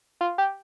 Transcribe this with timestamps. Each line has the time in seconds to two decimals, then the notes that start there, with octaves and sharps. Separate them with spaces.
0.21 F4
0.38 G4